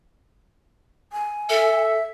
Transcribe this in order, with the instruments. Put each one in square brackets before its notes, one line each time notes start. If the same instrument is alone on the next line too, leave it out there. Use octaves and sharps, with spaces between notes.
[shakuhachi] G#5
[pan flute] A4 [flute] E5